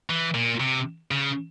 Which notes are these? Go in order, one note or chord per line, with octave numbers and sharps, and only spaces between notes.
E3
A#2
C3
C#3